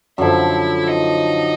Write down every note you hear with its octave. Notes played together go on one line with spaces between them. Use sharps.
F#2 D3 F3 E4
D#4